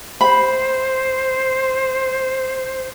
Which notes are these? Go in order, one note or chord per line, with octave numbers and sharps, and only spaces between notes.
C5 B5